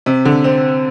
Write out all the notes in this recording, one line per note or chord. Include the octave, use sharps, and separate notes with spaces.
C3
D3
C4